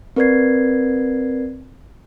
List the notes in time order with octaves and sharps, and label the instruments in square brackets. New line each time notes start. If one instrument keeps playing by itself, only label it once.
[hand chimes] C4 A#4 B4 D5 G#6 C7